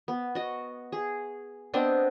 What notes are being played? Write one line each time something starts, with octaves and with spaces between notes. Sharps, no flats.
B3
F#4 D#5
G#4
B3 C4 D4 D#5